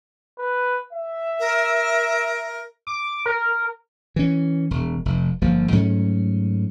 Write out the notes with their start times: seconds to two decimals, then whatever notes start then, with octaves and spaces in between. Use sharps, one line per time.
0.38 B4
0.93 E5
1.40 A#4
2.87 D6
3.26 A#4
4.16 E3 C#4
4.71 E1
5.05 F1
5.42 G1 F3 A#3
5.72 G#2 F#3 A3 C#4